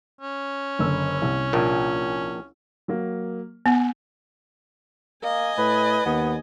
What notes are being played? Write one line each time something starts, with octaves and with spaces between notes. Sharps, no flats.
C#4
F#1 D3 E6
C2
A#1 A#2
F#3 A#3
B3 F#5 G#5
A#3 D#5 G#5
A2 B4
D#2 B3